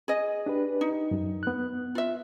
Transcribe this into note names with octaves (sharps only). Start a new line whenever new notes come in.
G#4 D#5
D4 G4 B4
D#4
F#2
B3 F#6
F4 E5